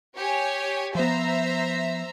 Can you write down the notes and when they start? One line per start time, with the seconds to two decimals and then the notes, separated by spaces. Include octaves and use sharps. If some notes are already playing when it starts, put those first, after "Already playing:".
0.16 G4 C#5 G#5
0.95 F3 B3 C5 E5 A#5